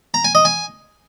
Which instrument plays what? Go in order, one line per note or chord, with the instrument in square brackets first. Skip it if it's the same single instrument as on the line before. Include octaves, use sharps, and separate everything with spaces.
[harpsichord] A#5
G#5
D#5
G#5